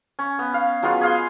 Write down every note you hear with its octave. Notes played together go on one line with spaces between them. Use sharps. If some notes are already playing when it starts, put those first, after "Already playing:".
C#4
B3
F5
F#3 G#3 B3 F4
G#4 F5 C6